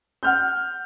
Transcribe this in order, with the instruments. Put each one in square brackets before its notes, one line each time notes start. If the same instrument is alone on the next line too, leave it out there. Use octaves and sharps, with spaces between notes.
[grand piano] F#5 F6 G6